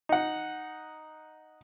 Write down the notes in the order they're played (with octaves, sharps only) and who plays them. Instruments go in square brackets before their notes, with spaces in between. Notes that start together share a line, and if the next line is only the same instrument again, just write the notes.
[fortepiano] D#4 F#5